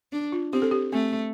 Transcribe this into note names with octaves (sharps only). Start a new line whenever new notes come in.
D4
F4
C4 G4
A4
G4
A3 C4